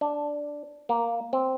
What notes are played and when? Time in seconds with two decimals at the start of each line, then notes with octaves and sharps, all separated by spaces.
0.01 D4
0.89 A#3
1.33 C4